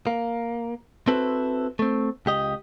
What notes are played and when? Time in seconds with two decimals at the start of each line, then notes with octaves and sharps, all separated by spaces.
0.07 A#3
1.08 C4 E4 F#4 A4 B4 C5
1.79 A3 C4
2.26 C#2 G4 D#5